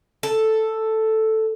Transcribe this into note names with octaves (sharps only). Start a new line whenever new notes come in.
A4